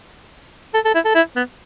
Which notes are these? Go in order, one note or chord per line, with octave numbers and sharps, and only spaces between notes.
A4
A4
E4
A4
E4
B3